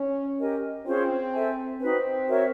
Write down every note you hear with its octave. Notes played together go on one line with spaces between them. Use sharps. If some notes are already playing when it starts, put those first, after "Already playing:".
Already playing: C#4
G4 A#4 D#5 G#5
C4 C#4 F4 G#4 C5
A4 C5 E5 G#5
C4 D#4 F#4 B4
F#4 A#4 C#5 E5